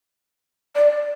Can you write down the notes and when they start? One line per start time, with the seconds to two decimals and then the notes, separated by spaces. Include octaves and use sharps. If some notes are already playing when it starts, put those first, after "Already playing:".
0.75 D5